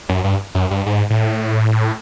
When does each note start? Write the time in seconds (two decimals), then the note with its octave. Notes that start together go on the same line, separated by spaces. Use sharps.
0.09 F#2
0.24 G2
0.55 F#2
0.71 G2
0.86 G#2
1.10 A2